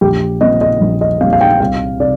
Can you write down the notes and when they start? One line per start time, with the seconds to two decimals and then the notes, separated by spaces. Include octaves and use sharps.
0.01 A#1 G4
0.41 A#2 G3 C4 D#5
0.61 D#5
0.81 A#1
1.01 D#5
1.20 A#2 G3 C4 F5
1.33 F5
1.41 G5
1.60 C2 F5
2.00 C3 D5